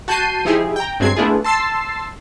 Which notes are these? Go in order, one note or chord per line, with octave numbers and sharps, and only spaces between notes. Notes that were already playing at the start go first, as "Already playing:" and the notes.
F#4 A5 G6 C7 D#7
F3 D#4 E4 G4 G#4
G5 A#5
G2 F#3 G#3 C4 G#6 C7
A3 B3 D4 E4 F4 G#4
A5 C6 E6 A6 C7